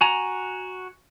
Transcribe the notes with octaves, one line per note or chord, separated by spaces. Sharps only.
F#4 G#5 A#5